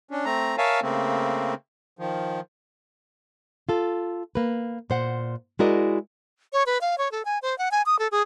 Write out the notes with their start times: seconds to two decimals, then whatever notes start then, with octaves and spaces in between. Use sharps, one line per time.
0.11 C#4 D4
0.25 A3 C4 A#5
0.58 A#4 C#5 E5 F5 G#5 A5
0.82 C#3 A3 A#3 C4
1.99 D#3 F3
3.69 F4 A4
4.35 A#3 B4
4.90 A#2 C5 F#5
5.59 G#3 E4 F#4 A#4 D5 D#5
6.53 C#5
6.66 B4
6.81 F5
6.98 C#5
7.12 A4
7.25 G#5
7.42 C5
7.58 F#5
7.71 G#5
7.86 D#6
7.99 A4
8.11 G#4